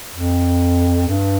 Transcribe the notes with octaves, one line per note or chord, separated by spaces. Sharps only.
F2
G2